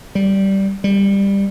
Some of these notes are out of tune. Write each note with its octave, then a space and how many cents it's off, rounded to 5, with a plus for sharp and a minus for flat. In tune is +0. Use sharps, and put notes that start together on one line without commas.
G3 -10
G3 +15